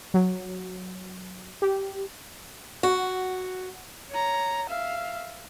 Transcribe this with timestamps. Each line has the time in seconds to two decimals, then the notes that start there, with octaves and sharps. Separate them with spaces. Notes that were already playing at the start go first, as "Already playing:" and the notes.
0.14 F#3
1.62 G4
2.83 F#4
4.11 C#5 A#5
4.69 E5 F5